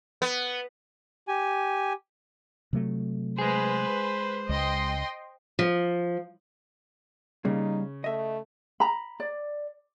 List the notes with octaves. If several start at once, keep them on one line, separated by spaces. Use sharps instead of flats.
B3
G4 G#5
C3 F#3 A3
G#3 G#4 B4 C5
C#2 D#5 G5 C6
F3
C#3 G3 A#3 D#4
A3 D#5 E5
A#5 B5
D5